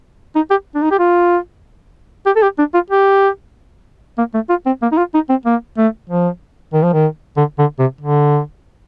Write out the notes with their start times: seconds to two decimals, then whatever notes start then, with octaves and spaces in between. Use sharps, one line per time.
0.35 D#4
0.51 G4
0.75 D4
0.82 D#4
0.91 G4
0.99 F4
2.26 G4
2.36 A4
2.42 G4
2.59 D4
2.74 F4
2.90 G4
4.18 A#3
4.34 A3
4.49 F4
4.66 C4
4.82 A#3
4.92 D#4
4.98 F4
5.14 D#4
5.30 C4
5.46 A#3
5.78 A3
6.09 F3
6.74 D#3
6.83 F3
6.93 D#3
7.37 D3
7.59 D3
7.79 C3
8.01 D3